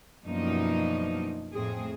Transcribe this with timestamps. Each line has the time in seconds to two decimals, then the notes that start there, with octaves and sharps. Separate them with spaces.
0.25 F#2 B2 F3 A#3 D4 D#4
1.53 F2 A2 C4 G#4